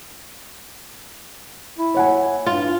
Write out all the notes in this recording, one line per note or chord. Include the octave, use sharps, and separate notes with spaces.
E4
C#5 F#5 G#5
G2 F4